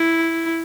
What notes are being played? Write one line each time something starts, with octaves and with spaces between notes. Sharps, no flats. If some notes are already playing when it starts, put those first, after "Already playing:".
Already playing: E4